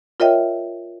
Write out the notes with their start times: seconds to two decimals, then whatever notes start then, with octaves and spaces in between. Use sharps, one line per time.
0.20 F4 A#4 C#5 D#5 E5 G5